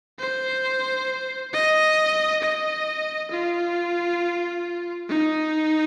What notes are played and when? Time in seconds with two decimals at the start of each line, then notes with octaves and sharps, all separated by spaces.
0.20 C5
1.53 D#5
2.42 D#5
3.31 F4
5.09 D#4